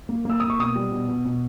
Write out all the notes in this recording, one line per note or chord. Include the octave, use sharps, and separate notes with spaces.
A#3
A#3 E6
A#3 D#6
C#6
B2 D#6
G3
B2
B2
B2